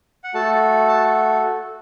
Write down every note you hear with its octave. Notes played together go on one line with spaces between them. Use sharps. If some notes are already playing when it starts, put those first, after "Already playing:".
F#5
A3 F#4 A4 A5
A5